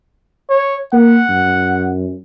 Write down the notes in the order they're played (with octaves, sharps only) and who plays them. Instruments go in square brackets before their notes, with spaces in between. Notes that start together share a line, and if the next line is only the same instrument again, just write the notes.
[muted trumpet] C#5
[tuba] A#3 [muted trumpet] F#5
[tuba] F#2